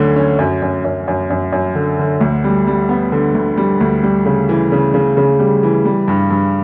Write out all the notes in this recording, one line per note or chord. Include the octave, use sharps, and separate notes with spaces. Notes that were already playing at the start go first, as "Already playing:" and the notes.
Already playing: D2 D3 F#3 C#4
C#4
F#2
F#2
F#2
F#2
F#2
F#2
D3
D3
D2
G3
G3
B3
D3
D2
G3
D2
G3
C#3
E3
C#3
C#3
C#3
G3
E3
G3
G2
G2